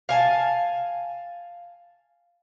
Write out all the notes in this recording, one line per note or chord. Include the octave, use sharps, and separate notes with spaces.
F5 G#5 A5